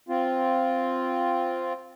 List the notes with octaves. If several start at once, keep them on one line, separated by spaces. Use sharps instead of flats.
C4 F4